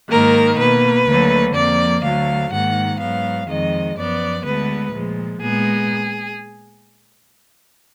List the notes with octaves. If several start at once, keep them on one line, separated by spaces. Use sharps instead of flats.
G#2 D#3 A#3 A#4
B2 A#3 B4
D2 D3 F#3 A#3
F2 F3 A#3 D5
D2 D3 F#3 F5
G#2 D#3 A#3 F#5
G#2 F#3 B3 F5
F2 D#3 G#3 D#5
F#2 F3 B3 D5
D2 D3 G#3 B3 B4
A#2 F3 G#3
A#2 G#3 B3 G#4